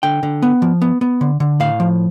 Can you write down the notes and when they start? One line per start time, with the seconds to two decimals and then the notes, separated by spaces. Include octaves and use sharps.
0.03 D3 G5
0.23 D3
0.42 B3
0.62 F3
0.82 B3
1.01 B3
1.21 D3
1.40 D3
1.60 A2 F5
1.80 F3